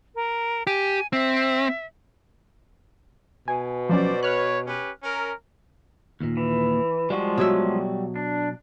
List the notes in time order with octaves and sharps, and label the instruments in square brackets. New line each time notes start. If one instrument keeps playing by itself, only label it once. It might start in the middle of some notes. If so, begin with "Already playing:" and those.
[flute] A#4
[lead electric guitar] G4 [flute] G#5
[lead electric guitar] C4 [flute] E5
[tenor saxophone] B2 [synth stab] G#5
[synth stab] F3 F#3 C#4 [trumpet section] C5 D5
[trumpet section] B4 C#5 [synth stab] F6 F#6
[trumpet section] C#4 G4 B4
C#4 A#4
[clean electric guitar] D#2 A#2
[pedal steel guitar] E3
[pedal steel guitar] F3 G#3 [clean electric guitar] G3 F#4
[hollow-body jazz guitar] B2 F#3 E5
[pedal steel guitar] D4